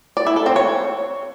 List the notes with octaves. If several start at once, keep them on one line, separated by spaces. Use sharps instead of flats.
D5
E4
A4
C4
C#5